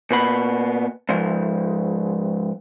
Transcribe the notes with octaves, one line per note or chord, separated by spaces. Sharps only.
A#2 B3 B5
G#2 F3